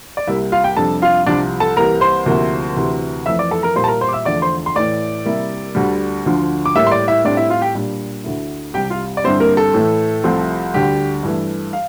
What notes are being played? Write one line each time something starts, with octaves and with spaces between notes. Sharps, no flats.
D5
C2 C3 G3 A#3 E4 E5
F4 F5
G4 G5
F2 C3 G3 D4 A4 A5
F4 F5
C2 C3 F3 D4 D5
A4 A5
C2 C3 E3 A#3 A#4 A#5
C5 C6
D2 C3 F3 A#3 E4
D2 C3 E3
F2 E3 A3 E5 E6
D5 D6
A4 A5
A#4 A#5
A#2 G3 A#3 E4 C5 C6
A5
A#4 A#5
C5 C6
D6
E5 E6
E2 D3 F3 A3 D5 D6
C5 C6
C6
A2 E3 A3 D5 D6
C3 G3 A#3 E4
D2 D3 G3
D2 D3 F3
D6
A2 G3 A#3 E5 E6
C6
D5 D6
E4 E5
A2 G3 C4 D4 D5
E4 E5
F4 F5
G4 G5
A#2 G3 D4
D2 D3 A3 E4
C2 C3 G3 G4 G5
F4 F5
D5
G2 D3 G3 C4 E4 C5
A#3 A#4
A4
A2 E3 A3
C2 C3 F3 A3 C4
D2 D3 G3 G4
G2 E3 A3
F5